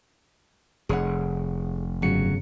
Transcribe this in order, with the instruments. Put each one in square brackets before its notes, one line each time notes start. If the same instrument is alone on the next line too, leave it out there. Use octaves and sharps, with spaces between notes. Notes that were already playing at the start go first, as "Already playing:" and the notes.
[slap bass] F1 [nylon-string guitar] G#4 C#5 F#5
[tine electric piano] G1 C#3 C#7 [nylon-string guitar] F#3